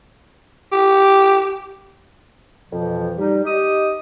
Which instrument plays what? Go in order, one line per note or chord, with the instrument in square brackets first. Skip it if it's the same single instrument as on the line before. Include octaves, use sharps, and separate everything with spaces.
[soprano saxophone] G4
[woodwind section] F2 B2 E3 F3
G3 D#4
D#4 G4 D#5 D#6